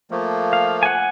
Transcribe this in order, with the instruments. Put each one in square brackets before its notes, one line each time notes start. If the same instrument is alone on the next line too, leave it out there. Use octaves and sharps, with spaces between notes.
[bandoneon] F3 A3 A#3
[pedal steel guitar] F5
F#5 G#5